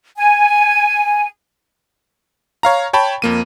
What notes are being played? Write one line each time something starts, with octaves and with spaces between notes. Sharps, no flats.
G#5
C#5 F5 A#5
C#5 G5 A5 B5
F2 A#3 D#7